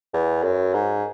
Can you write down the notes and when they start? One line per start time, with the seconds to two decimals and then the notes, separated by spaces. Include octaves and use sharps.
0.13 E2
0.43 F#2
0.74 G#2